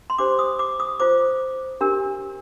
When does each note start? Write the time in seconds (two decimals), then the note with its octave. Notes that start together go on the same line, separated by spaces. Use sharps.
0.10 C6
0.18 D4 G4 C5 D6
0.39 D#6
0.59 D6
0.80 D#6
1.00 F4 C5 D6
1.81 D4 G4 A#4